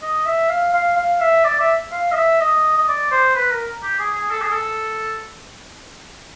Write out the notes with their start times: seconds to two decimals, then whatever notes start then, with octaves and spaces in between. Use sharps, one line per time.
0.02 D#5
0.26 E5
0.49 F5
0.73 F5
0.97 F5
1.21 E5
1.44 D5
1.60 E5
1.92 F5
2.12 D#5
2.16 E5
2.40 D#5
2.78 D#5
2.88 D5
3.11 C5
3.35 B4
3.52 A#4
3.83 G4
3.99 G#4
4.14 G#4
4.31 A4
4.42 G#4
4.52 A4